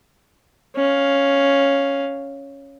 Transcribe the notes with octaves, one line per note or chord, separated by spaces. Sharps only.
C#4 F5